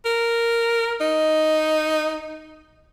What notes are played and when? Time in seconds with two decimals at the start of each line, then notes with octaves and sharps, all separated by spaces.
0.05 A#4
1.01 D#4